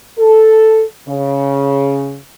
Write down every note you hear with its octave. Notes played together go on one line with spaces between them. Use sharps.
A4
C#3